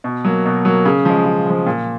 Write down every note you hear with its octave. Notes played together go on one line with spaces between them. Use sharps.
B2
F#3 A#3
B2
F#3 A#3
C#3
F3 G#3
C#3
F3 G#3
A#2